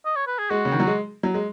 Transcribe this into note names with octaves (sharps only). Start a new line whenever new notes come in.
D#5
C#5
B4
G#4
G#3 F#4
C#3
D#3
F#3
G#3
F#3
G#3